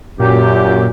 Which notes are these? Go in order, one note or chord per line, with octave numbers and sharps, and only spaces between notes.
F#2 A#2 G4